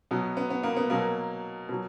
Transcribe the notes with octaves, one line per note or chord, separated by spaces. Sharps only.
B2 F#3 B3
B3
B3
A#3
B3
B2 F#3 A#3
B2 F#3